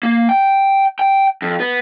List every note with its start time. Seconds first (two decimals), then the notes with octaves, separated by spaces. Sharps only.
0.03 A#3
0.29 G5
0.99 G5
1.42 F2
1.60 B3